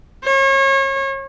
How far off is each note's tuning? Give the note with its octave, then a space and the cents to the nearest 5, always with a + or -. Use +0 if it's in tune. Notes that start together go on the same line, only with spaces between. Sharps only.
C#5 -35